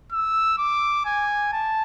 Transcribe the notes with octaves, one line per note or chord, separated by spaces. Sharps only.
E6
D6
G#5
A5